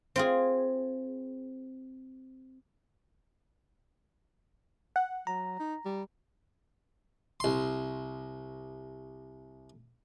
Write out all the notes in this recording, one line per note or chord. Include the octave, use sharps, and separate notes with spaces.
C4 F4 G#4
F#5
F#3 A#5
D#4
G3
C2 C6